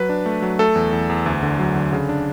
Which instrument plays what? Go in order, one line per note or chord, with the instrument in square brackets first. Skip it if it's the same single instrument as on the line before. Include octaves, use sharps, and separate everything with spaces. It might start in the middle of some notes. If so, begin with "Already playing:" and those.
Already playing: [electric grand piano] F#3 B4
D4
A3
F#3
A3 A4
E2
E2
E2
D2
D3
F#3
D3
C#3
D4